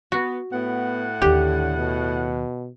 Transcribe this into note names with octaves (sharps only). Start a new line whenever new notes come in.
B3 F#4
A2 B3 F#5
D#2 D3 D#3 G4
B2